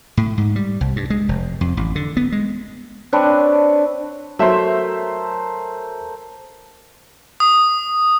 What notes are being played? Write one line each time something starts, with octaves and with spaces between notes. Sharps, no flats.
A2
G#2
G3
C2
G2
G#3
F1
F2
A1
D3
B3
G#3
C4 D4 B4 C#5
F#3 A3 A#4 C5 E5
D#6